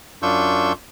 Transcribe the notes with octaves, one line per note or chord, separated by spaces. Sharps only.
F#2 D4 F4 C#6 E6 G6